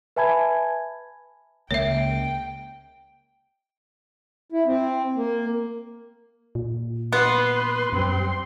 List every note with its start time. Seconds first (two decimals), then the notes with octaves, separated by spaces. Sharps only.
0.16 B4 E5 G#5 A5 B5 G#6
1.71 C#2 C#3 A#3 C#5 E5 G5
4.52 E4
4.66 C4
5.16 A#3
6.55 A#2
7.13 B3 B4 C6
7.93 F#2 G3 C4 C6